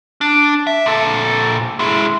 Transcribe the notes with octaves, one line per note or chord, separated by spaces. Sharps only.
D4
E5
A#2 A4
G#3 E4